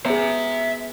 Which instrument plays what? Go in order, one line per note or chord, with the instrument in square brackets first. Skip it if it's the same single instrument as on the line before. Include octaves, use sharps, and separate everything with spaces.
[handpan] B3 G#4 [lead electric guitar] E5 A#5